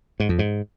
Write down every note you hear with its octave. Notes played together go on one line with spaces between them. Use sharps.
G#2
F2
G#2